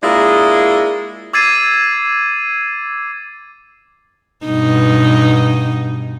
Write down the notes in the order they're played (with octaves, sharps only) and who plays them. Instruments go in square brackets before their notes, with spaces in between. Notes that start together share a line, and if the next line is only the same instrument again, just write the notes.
[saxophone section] G#3 A#3 D4 E4 F4 G#4
[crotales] D6 E6 G#6 A6 C7 D#7
[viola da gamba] G2 B2 D#4